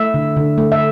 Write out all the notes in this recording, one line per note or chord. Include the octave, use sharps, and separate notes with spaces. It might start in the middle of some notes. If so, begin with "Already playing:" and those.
Already playing: A3 E5
D3
D3
A3
E5